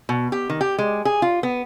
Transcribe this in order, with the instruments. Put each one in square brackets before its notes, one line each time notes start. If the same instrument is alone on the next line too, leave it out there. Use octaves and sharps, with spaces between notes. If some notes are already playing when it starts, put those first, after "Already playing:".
[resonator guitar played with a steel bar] B2
G4
D#3
G4
G#3
G#4
F4
B3